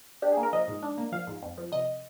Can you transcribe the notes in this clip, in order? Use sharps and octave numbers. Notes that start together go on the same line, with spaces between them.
D4 G4
G#4
A#3
A#4
F3 D#5
G#2
D4
A#3
F3 F5
G#2
F2
F3
C3 D#5